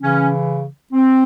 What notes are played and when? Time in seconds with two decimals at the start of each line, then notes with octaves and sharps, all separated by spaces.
0.01 C#3 E3 C#4
0.93 C4